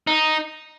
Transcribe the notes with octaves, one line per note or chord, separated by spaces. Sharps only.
D#4